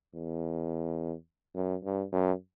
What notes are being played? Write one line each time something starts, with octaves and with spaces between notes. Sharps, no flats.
E2
F#2
G2
F#2